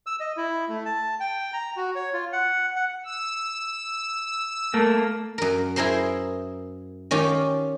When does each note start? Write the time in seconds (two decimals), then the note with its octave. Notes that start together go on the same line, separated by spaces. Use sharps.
0.06 E6
0.20 D#5
0.37 E4
0.69 A3
0.86 A5
1.20 G5
1.53 A#5
1.76 F#4
1.95 C#5
2.13 F4
2.33 F#5
2.76 F#5
3.05 E6
4.74 A3 A#3
5.38 F#2 A#4
5.76 E4 G#4 A#4 C5 C6
7.11 D#3 C#4 F4 G4